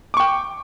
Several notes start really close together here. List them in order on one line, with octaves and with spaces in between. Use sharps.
D6 C#6 G5